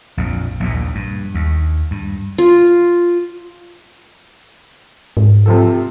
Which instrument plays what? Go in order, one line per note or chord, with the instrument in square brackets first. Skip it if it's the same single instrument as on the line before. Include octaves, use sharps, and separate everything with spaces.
[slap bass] A#1 F2
A#1 D#2 A#2
G2
D#2
G2
[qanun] F4
[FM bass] G#2
[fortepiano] C3 F3 A4